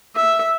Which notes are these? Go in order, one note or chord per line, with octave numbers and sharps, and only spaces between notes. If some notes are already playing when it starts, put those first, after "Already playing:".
E5